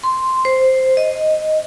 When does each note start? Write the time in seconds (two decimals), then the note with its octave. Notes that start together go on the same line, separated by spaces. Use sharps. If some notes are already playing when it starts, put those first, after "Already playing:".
0.04 C6
0.45 C5
0.97 D#5